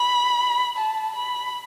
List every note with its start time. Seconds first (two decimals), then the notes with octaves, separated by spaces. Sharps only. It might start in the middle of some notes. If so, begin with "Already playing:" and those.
Already playing: B5
0.77 A5
1.15 B5